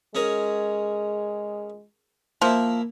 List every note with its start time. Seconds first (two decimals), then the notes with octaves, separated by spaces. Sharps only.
0.15 G#3 C#4 G#4 A#4
2.42 F3 A#3 E4